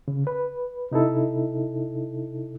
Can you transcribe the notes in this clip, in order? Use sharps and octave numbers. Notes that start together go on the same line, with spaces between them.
C#3
B4
C3 D#4 E4 A4